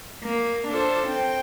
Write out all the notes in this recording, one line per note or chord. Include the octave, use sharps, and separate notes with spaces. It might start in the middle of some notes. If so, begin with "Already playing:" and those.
A#3
D4 F4 A4 C5
C4 G5